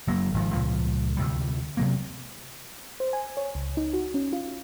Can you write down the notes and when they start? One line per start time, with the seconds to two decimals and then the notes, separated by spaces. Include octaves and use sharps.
0.07 F#1 F#3 A#3
0.34 G#1 F3
0.53 C#2 A#2 F3
1.17 D2 C3 G3
1.77 C3 F#3 A#3
3.00 C5
3.13 G#5
3.37 C#5
3.55 C#2
3.77 D#4
3.93 F#4
4.14 C#4
4.33 F4